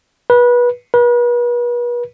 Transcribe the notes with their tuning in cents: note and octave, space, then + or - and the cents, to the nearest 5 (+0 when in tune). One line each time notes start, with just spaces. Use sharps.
B4 -25
B4 -40